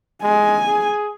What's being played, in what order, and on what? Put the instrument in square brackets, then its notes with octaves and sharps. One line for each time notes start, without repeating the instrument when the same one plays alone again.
[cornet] G#3 [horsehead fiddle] G#5
[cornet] G#4